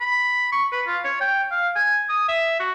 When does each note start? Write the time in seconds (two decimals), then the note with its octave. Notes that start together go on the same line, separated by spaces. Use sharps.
0.01 B5
0.52 C#6
0.72 B4
0.87 F4
1.04 C#5
1.20 G5
1.51 F5
1.76 G#5
2.09 D#6
2.28 E5
2.60 F#4